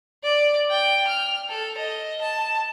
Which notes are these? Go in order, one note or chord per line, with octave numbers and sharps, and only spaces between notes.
D5
G5
F6
A4
D#5
A5